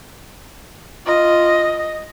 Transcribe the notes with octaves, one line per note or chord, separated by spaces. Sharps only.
F4 D#5